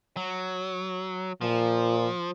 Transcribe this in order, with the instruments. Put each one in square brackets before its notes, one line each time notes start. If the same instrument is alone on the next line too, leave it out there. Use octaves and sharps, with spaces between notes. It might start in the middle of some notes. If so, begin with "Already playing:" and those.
[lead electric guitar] F#3
[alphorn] A#2 [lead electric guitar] F3